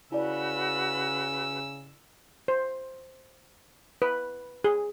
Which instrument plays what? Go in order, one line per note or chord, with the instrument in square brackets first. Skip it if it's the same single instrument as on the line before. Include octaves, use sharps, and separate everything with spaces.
[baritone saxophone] C#3 [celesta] E4 D5 [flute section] F#4 B4 [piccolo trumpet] E6
[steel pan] C5
B4
G#4